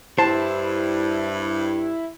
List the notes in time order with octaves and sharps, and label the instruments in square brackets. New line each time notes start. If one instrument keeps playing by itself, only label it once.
[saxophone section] G2 [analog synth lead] E4 [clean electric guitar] C5 [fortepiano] A5